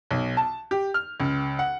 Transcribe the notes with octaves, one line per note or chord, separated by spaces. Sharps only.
B1
A5
G4
F6
C#2
F#5